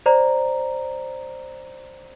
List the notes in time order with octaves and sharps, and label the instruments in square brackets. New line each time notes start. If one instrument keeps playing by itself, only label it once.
[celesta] C5 D5 A#5